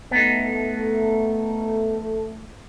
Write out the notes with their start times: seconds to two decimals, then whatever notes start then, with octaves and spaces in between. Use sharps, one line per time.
0.11 A3 B3 D#4